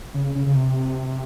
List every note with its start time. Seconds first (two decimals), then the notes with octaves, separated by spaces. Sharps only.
0.14 C#3
0.35 C#3
0.46 C#3
0.56 C3